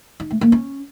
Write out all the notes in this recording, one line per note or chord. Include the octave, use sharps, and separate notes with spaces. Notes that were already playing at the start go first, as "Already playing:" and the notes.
D#4
A3
A#3
C#4